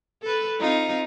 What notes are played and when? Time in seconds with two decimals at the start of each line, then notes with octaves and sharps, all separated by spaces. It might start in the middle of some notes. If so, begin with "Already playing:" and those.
0.23 A4 B4
0.60 C4 D#4 F4